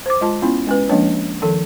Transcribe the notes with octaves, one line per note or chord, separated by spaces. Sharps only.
C5 D6
G#3 F4 A5
B3 C#4 E4 F4
G#3 C#4 B4
F3 G#3 A#3 C#4 D4 C#5
D#3 F3 A4